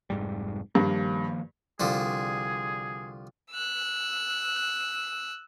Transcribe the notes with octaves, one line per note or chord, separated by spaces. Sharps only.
F1 G#2 G3
G2 D#3 F3 A#3
C2 D3 F3 G#4
E6 F#6